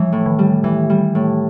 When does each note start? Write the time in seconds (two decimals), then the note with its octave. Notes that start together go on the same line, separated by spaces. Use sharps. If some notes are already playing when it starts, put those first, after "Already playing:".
Already playing: E3 F3 G3 G#3
0.13 A2
0.26 D#3
0.39 G3
0.64 D#3 E3
0.90 G3
1.15 A2